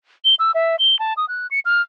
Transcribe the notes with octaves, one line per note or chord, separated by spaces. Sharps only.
G7
E6
E5
G7
A5
D#6
F#6
C#7
F6